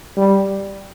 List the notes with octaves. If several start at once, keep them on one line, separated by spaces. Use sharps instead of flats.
G3